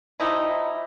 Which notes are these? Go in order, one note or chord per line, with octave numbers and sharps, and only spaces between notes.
F3 G3 D#4 E4